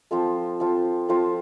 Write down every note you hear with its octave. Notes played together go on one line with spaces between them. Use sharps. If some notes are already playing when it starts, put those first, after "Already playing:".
F3 C4 F4 A4
F3 C4 F4 A4
F3 C4 F4 A4